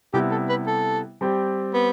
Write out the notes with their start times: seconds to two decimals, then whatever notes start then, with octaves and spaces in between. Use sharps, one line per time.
0.13 C3 G3 B3 E4 G4
0.31 A4
0.49 B4
0.67 A4
1.21 G3 C4 G4
1.74 B3